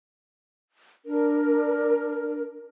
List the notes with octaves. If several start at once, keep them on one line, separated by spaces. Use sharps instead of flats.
D4 A#4